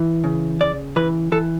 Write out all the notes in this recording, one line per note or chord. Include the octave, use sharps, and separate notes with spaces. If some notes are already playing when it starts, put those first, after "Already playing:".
Already playing: E3
C#3
C#3 D5
E3 B4
E3 A4